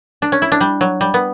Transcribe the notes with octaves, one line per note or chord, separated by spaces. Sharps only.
D4
C#4
E4
D4
G3
F#3
G3
B3